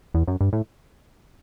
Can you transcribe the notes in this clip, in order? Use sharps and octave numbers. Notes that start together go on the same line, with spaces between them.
E2
F#2
G2
A2